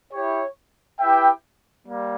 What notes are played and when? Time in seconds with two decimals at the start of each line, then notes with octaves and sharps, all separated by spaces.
0.13 E4 G4 C#5
1.00 E4 G4 B4 E5 G5
1.87 G3 A#3